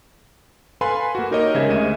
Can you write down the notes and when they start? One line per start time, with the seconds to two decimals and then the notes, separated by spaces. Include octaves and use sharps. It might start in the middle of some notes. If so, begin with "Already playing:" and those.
0.81 A4 B4 F5 G#5 B5 C6
1.15 A#3 F#4
1.31 D#4 G4 A#4 C#5 D#5
1.54 C#3 G#3 C5 E5 G#6
1.70 D2 D#5 E5 D#7